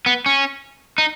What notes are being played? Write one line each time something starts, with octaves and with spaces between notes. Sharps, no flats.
B3
C#4
D#4